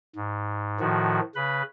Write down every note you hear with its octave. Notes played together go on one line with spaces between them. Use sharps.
G#2
A2 D#3 F3 F#4
C#3 B4 B5